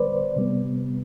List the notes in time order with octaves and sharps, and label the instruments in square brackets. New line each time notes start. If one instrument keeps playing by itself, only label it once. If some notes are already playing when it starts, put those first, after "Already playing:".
Already playing: [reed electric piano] D3 G3 B3 B4 C5 D5
C3 G3 B3